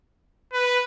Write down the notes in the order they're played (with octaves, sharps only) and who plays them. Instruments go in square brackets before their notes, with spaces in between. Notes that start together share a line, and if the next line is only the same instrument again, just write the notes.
[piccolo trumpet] B4